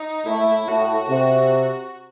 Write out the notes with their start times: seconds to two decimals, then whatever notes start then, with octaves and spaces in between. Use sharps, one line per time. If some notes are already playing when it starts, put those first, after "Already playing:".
Already playing: D#4
0.26 A2 A3 E4
0.68 A2 A3 F#4
1.09 C3